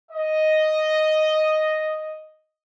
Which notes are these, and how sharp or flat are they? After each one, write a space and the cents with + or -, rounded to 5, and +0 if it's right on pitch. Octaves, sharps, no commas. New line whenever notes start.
D#5 +0